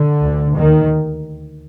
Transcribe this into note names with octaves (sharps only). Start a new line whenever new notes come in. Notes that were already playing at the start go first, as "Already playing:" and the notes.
Already playing: D3
D2
D#2 D#3